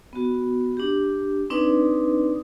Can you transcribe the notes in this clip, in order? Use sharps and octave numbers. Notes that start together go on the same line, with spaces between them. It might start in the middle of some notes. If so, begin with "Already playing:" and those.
B3 F#4
D4 G4
C4 D4 D#4 B4 D5 D#6